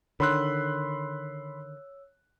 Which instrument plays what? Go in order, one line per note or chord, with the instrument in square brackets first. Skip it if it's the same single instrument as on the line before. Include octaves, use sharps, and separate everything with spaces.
[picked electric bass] D3 D#3 [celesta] C#5 E6 [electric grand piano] B5 C6 F#6